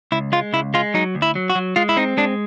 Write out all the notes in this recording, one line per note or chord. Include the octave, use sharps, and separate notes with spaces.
C#2 E4
G#3 F4
C#2 E4
G#3 F4
F#3 D#4
D2
E4
F#3
F#4
F#3
G#3 F4
E4
C4 D#4
G#3 D4